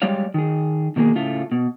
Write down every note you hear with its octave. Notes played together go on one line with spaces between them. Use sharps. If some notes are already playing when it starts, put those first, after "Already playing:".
G3 G#3 G4 C#5 D5 F5
D#3 G#4
B2 D#3 A#3 F#4 G#4
A2 C#3 A3 F4
B2